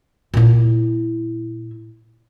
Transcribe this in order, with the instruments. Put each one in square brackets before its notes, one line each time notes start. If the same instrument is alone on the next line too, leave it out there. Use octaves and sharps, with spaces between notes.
[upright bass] A#2 E4